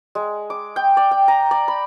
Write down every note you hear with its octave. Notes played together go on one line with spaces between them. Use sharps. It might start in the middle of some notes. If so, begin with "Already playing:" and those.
G#3
D6
G5
D5
G5
A#5
D5
B5